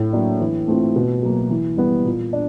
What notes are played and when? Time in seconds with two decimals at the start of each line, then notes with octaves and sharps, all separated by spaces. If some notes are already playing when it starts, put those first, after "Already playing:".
Already playing: A2
0.13 F#3 A#3 D4
0.40 E3
0.68 A3 C4 F4
0.96 B2
1.22 F#3 A#3
1.50 E3
1.77 G3 B3
2.05 A#2
2.33 D4